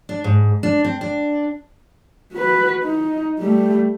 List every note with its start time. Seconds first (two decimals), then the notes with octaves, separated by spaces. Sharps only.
0.09 D4
0.24 G#2
0.63 D4
0.84 C4
1.01 D4
2.33 F#4 B4
2.83 D#4
3.39 G3 A3